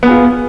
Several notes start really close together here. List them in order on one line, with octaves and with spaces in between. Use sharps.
B3 G#4 F4